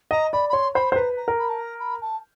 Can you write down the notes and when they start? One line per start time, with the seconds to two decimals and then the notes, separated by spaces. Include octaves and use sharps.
0.11 D#5 A#5
0.33 D5 B5
0.49 B5
0.53 C#5 C6
0.75 C5 B5
0.92 C5
0.95 B4 A#5
1.17 A#5
1.28 A#4
1.39 B5
1.49 A5
1.59 A#5
1.80 B5
2.02 A5